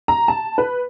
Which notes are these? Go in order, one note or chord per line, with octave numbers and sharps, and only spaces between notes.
A#5
A5
B4